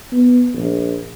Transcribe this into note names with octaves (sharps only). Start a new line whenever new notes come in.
B3
A#1